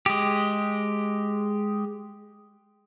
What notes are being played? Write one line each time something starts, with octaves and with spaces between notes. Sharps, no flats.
G#3 G4